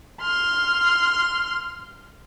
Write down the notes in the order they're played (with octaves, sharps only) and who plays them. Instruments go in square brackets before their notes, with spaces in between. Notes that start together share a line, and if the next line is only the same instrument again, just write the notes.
[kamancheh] C6 F6